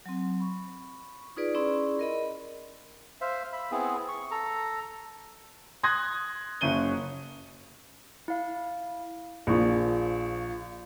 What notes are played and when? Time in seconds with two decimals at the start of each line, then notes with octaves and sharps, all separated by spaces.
0.06 F#3 C4
0.40 B5 C#6
1.37 D#4 F4 G#4 B4 D5
1.55 C#4 E4 G#4 D5 B5 C6
1.99 A#4 D#5 B5
3.21 C5 E5 F5
3.53 E5 B5
3.71 B3 C4 E4 G#4
4.08 C#6
4.31 A4 A#5
5.83 C6 D#6 F#6 G#6 A#6
6.61 F#1 C#4 D#7 G7
8.28 E4 F5
9.47 A#1 F3 G#4 C#6